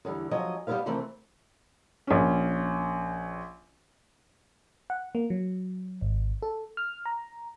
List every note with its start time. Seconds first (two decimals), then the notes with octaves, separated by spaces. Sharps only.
0.05 E2 D3 G3
0.31 F3 F#3 D#5 G#5
0.67 G3 B3 D#4 E4 B4 F5
0.86 C3 D#3 E3 A3 C4 A4
2.07 A#1 C#4
4.90 F#5
5.15 A#3
5.30 F#3
6.01 G#1
6.42 A4
6.77 F6
7.06 A#5